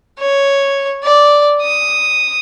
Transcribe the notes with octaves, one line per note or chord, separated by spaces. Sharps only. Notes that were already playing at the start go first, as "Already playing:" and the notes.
C#5
D5
D#6